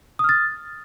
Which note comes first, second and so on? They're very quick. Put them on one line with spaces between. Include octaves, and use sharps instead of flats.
D#6 F6 A6